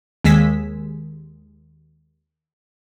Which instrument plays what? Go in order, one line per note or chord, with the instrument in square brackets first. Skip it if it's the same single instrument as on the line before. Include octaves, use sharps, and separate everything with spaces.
[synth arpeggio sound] D#2 G#3 G#5 E6 B6